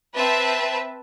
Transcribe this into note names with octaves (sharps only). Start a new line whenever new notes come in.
C4 B4 E5 A5